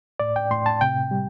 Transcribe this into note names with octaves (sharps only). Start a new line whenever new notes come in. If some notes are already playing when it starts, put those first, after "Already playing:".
A2 D5
G5
A2 C6
A5
C3 G5
G3